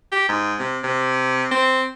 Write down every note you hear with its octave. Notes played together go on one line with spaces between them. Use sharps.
G4
G#2
C3
C3
C4